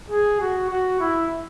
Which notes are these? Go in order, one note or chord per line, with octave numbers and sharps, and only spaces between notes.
G#4
F#4
F#4
E4